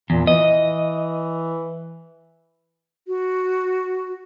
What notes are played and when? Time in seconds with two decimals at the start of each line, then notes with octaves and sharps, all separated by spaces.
0.10 E2 A#2
0.27 E3 D#5
3.07 F#4